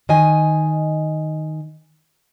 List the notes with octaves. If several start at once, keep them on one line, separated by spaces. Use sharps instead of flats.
D#3 D#5 G#5